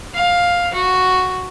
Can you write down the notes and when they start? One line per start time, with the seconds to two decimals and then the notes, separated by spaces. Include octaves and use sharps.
0.14 F5
0.74 F#4